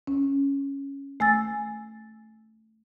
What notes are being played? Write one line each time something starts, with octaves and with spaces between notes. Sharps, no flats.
C#4
A3 G#5 E6 A6